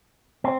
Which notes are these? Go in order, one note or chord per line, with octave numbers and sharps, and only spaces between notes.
C4